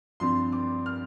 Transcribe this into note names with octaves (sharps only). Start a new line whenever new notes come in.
G2 F3 C4 C6
D6
F6